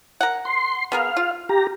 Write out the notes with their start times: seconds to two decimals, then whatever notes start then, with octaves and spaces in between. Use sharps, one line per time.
0.21 A#4 F#5
0.45 C6
0.92 B3 G#4 A#4 F5
1.17 F4
1.49 G4 A#5